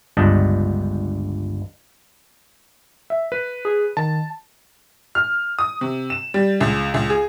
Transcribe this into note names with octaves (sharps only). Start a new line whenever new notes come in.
G1 C#2 G2 D4 D#5 A5
E5
B4
G#4
D#3 A5
F6
D#6
C3
E7
G3
C#2
C#2
G#4